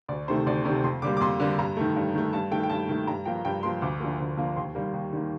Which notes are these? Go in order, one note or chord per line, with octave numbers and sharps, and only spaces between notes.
D2 D5
C3 D#3 A3 C5
D2 D5
C3 D#3 A3 D5
F2 C6
D3 G3 A#3 D6
D6
F2 C6
D3 G3 A#3
G2 A#5
D#3 A3
G2
D#3 A3
G2 A5
D#3 A3 G5
G5
G2 A5
D#3 A3
G2 A#5
F3 A#3 G5
G2 G5
F3 A#3 C6
D2 D6
D3 F3 A#3
D2
D3 F3 A#3
D#2 C6
D#3 G3 A#3
D#2
D#3 G3 A#3